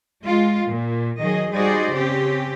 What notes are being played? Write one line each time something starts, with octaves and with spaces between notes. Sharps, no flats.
G#3 F4
A#2
D#3 F#3 G#4 D#5
G3 D#4 F#4 G#4 C5 D5
C#3 C4 C#4 G4